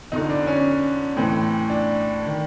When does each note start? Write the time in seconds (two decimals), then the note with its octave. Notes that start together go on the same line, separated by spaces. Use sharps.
0.12 F2 D3 D#4
0.29 D4
0.47 C#4
1.16 A2 E3 C4
1.70 D4
2.26 D#3